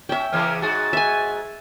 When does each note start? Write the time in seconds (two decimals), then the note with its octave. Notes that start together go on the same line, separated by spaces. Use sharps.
0.09 C#4 E5 G5
0.32 C#3 E3 A#3 F6
0.62 G#2 F#4 G#4 A6
0.93 E5 G#5